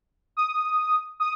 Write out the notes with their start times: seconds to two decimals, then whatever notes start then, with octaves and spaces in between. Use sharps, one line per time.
0.37 D#6
1.20 D#6